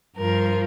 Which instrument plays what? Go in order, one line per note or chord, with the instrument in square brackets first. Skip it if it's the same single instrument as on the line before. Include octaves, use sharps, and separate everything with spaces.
[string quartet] G2 F3 A#4